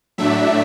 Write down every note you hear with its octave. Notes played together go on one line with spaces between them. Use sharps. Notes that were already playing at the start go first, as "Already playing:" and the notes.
A2 F#3 A3 D4 E5